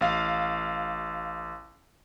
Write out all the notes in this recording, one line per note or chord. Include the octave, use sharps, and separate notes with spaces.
A1 F5